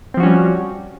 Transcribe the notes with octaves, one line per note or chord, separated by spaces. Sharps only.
F3 G3 C4 C#4 F#4